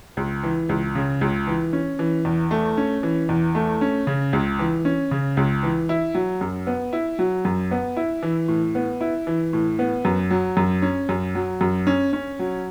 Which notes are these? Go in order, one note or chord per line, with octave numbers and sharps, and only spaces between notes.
C#2
E3
C#2
C#3
C#2
E3
C#4
E3
E2
A3
C#4
E3
E2
A3
C#4
C#3
C#2
E3
C#4
C#3
C#2
E3
E4
F#3
F#2
B3
E4
F#3
F#2
B3
E4
E3
A2
B3
E4
E3
A2
B3
F#2
F#3
F#2
C#4
F#2
F#3
F#2
C#4
C#4
F#3